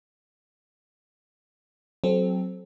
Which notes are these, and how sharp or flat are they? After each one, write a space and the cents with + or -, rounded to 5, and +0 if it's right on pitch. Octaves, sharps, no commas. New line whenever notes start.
F#3 +0 C4 +0 A4 -25